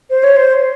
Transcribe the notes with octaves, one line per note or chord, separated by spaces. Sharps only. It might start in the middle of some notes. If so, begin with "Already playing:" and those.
C5
C#5
C5